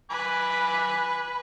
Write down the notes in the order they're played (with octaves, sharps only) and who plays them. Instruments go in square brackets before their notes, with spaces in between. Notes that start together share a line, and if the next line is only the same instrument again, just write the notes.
[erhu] B4 [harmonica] G#5 B5 D6